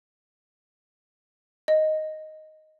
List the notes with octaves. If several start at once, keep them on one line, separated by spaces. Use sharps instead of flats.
D#5